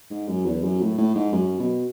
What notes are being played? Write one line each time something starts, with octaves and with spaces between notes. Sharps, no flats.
G#2
F#2
E2
F#2
A2
A2
G#2
F#2
B2